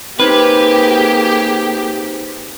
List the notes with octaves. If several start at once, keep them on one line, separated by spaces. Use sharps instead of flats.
A#3 C4 D#4 G4 G#4 B4 C5